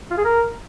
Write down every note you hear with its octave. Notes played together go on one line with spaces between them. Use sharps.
F4
G#4
A#4